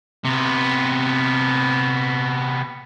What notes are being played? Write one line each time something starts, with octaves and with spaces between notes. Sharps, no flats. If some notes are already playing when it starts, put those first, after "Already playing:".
C3 B3